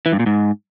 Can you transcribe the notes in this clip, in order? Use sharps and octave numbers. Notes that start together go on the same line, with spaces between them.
E3
G2
A#2
G#2